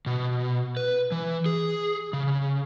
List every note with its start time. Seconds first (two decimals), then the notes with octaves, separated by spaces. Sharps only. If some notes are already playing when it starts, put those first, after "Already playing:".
0.06 B2
0.77 B4
1.12 E3
1.46 G#4
2.13 C#3